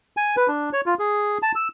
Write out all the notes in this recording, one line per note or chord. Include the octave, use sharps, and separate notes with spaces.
G#5
B4
D4
C#5
F4
G#4
A5
E6